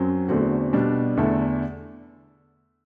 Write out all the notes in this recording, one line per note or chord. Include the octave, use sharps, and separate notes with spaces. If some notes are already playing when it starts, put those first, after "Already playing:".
Already playing: F#2 F#3 C4
E2 D3 A3 C4 F#4
B2 G3 D4
E2 D3 A3 E4 A4